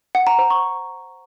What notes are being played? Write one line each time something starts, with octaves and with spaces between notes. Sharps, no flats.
F#5
A#5
C5
C#6